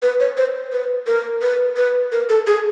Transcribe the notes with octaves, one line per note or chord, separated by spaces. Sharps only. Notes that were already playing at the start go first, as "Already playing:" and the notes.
B4
C#5
C5
B4
A#4
B4
B4
A#4
A4
G#4